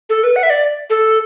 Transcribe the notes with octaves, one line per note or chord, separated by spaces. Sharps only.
A4
B4
F#5
E5
D5
A4